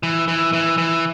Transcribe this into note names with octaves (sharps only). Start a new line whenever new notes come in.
E3
E3
E3
E3